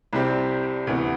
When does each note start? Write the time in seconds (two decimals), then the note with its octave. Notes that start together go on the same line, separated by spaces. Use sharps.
0.13 C2 C3 G3 C4 G4
0.87 D2 C3 E3 B3